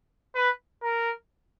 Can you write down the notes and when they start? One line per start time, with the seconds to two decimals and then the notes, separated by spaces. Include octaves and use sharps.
0.35 B4
0.83 A#4